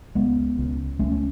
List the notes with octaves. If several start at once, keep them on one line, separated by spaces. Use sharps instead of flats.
C#2 G#3 B3
C#2
C#2 A3 C#4
C#4